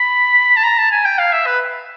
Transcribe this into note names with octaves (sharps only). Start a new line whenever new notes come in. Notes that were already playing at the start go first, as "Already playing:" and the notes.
Already playing: B5
A5
A#5
A5
G#5
G5
F5
E5
B4